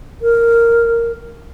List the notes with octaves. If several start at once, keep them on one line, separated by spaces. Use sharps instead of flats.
A#4